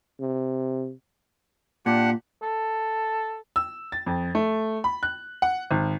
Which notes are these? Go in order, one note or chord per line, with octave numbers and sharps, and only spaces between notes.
C3
A#2 D4 G4 F#5
A4
E6
A6
F2
A3
B5
F#6
F#5
G#1